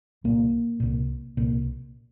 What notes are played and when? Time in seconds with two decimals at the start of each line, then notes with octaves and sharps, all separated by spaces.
0.24 C2 A#2 A#3
0.80 C2 A#2
1.37 C2 A#2